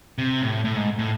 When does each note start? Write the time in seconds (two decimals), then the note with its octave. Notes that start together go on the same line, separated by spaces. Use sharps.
0.18 C3
0.42 A2
0.65 A2
0.76 G#2
0.99 A2